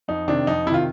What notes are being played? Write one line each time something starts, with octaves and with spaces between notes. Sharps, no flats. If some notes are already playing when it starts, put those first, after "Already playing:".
F2 D#4
C3 D#3 D4
F2 D#4
C3 D#3 E4 F4